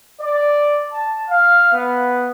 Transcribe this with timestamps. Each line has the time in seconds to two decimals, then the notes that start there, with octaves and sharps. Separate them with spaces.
0.21 D5
0.91 A5
1.29 F5
1.73 B3